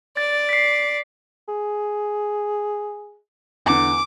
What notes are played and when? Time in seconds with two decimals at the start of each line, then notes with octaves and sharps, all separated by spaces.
0.17 D5 A6
0.49 B6 C7
1.49 G#4
3.66 E2 D3 D6